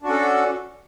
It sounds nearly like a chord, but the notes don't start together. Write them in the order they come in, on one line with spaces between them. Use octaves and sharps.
D4 F#4 C#4 A4